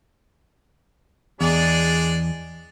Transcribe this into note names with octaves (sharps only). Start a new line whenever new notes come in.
E2 G#3 D4 D5